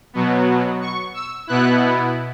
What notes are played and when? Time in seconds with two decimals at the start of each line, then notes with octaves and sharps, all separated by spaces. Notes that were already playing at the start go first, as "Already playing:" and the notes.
0.13 B2 F#3 B3
0.81 C#6
1.14 E6
1.47 B2 B3 E4 F#6